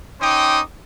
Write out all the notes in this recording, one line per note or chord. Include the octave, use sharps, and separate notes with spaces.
C#4 D#4 C5 G5 D6 D#6